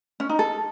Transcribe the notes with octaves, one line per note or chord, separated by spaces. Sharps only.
C#4
D#4
A4